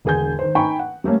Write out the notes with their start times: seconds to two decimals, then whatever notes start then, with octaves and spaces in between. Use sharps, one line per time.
0.05 E1 D3 G#4 G#5 G6
0.39 D#3 C5
0.55 D#4 G5 G#5 B5 C#6
0.79 F#5
1.04 G3 A3 A#3 C#4